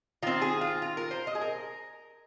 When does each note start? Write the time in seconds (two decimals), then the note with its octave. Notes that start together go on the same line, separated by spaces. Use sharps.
0.22 D#3 C4 F4
0.41 G#4
0.61 F4
0.82 F4
0.97 A#4
1.11 C5
1.27 D#5
1.35 G#4
1.41 A#4